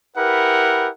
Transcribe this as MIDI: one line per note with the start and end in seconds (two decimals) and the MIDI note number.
0.16 0.88 64
0.16 0.88 67
0.16 0.88 70
0.16 0.88 71
0.16 0.88 78